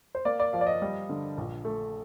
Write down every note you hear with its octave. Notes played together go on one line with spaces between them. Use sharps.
C5
A#3 D5
D5
F3 F5
D5
D#5
G3
D3
A#1
A3